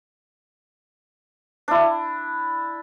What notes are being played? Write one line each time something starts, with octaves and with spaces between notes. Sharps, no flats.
D4 E4